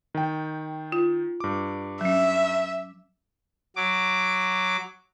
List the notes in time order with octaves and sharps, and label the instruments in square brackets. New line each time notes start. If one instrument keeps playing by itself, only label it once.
[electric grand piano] D#3 G5
[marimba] F4
[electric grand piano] G2 D6
[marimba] F#3 C#4 [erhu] E5
[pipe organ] F#3 D6